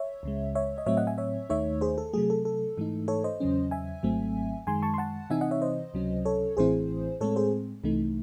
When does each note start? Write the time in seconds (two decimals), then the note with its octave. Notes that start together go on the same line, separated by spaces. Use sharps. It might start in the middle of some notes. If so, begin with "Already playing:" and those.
Already playing: C#5 E5
0.23 C#2 C#3 G#3
0.55 C#5 E5
0.78 D#5
0.86 A2 F#3 A3 C4 C#5 E5
0.97 D#5 F#5
1.07 E5 G#5
1.18 C#5 E5
1.49 D#2 D#3 A3 D#4 C#5 E5
1.81 G#4 C5
1.98 A4
2.13 C3 F#3 A3 G#4
2.30 A4
2.45 A4
2.77 G#2 E3 A3 D#4
3.08 A4 C#5
3.24 C5 D#5
3.40 E2 C#3 F#3 C#4
3.71 E5 G#5
4.03 G#1 G#2 F#3 A3 C4
4.67 F#2 D#3 G#3 G#5 C6
4.82 A5 C#6
4.94 C6
4.98 F#5 A5
5.30 C3 E3 C4 D#4 E5 G#5
5.41 D#5 F#5
5.51 C#5 E5
5.62 C5 D#5
5.94 C#2 C3 F#3 C#4
6.25 A4 C#5
6.57 A1 A2 E3 C4 E4 G#4 C5
7.21 A2 G#3 C4 A4 C#5
7.36 G#4 C5
7.84 C2 C3 E3 A3 D#4